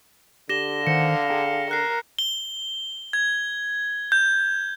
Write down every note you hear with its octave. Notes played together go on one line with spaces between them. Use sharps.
D3 G4 A#6 E7 G7
D#3 C5 F5 F#5 C#7
G#4 G5 A#5
A#4 F#6 C7
G7
G#6
G6